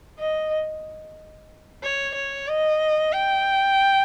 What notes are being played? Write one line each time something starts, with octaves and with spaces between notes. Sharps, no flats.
D#5
C#5
C#5
D#5
G5